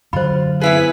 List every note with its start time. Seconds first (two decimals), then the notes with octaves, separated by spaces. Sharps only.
0.13 F#2 D3 F#3 F4 C5 B5
0.61 B3 E4 G#4 B4 B6